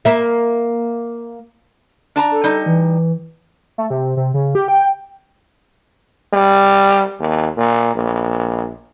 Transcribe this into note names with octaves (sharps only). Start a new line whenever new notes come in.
A#3 E5
D4 A5 A#5
A4
G3 D#4
E3
A3
C3
C3
C#3
G4
G5
G3
D#2
A#2
A#1